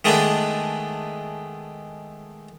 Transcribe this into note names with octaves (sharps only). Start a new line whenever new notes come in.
D#3 G#3 A3 B3 D4